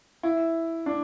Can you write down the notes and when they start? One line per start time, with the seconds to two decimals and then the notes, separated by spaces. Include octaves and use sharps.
0.23 E4
0.86 D4